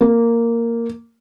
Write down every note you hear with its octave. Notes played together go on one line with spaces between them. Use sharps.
A#3